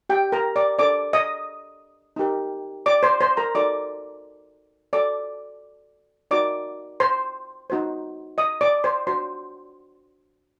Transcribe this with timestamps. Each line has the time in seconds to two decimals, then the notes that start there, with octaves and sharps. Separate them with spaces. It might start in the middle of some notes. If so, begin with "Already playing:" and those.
0.09 G4 G5
0.32 A#4 A#5
0.56 D5 D6
0.79 D4 A4 C5 D5 D6
1.13 D#5 D#6
2.16 D#4 G4 A#4
2.86 D5 D6
3.03 C5 C6
3.21 C5 C6
3.37 A#4 A#5
3.55 D#4 F#4 A4 C5 D5 D6
4.93 F#4 A4 C5 D5 D6
6.31 D#4 F#4 A#4 D5 D6
7.00 C5 C6
7.70 D#4 F#4 C5
8.38 D#5 D#6
8.61 D5 D6
8.84 C5 C6
9.07 D4 F#4 C5 C6